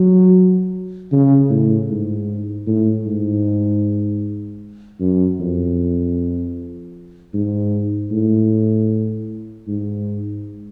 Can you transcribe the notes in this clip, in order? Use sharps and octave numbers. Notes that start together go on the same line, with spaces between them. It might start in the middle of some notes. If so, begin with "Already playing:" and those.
Already playing: F#3
C#3
A2
G#2
A2
G#2
F#2
F2
G#2
A2
G#2